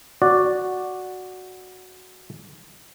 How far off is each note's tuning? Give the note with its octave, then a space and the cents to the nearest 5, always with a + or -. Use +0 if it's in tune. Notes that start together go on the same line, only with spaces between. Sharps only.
F#4 +0 D5 +0